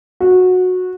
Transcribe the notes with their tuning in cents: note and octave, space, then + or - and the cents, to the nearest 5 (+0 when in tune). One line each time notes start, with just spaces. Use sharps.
F#4 -15